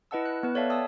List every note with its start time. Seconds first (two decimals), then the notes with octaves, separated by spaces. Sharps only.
0.11 E4 B4 D#5 F#5 A5 E6
0.25 F#6
0.43 B3 B4
0.55 A4 C#5 D5 E5 F5 A5
0.70 G5 A5 D#6 E6